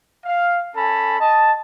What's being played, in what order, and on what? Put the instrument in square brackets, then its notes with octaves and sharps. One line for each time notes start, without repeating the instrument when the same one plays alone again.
[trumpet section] F5
C#4 A4 G#5 A5 B5
D#5 A5